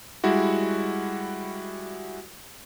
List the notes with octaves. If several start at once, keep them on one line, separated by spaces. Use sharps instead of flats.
G3 G#3 E4 F#4